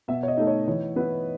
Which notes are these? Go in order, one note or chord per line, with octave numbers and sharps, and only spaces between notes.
B2 E5
C#5
D#5
A3 D#4
C#5
E3 C#5
B3 E4 B4